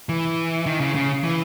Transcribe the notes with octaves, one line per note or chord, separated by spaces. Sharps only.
E3
D#3
C#3
C#3
E3